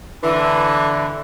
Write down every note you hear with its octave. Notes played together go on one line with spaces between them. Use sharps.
D3 E3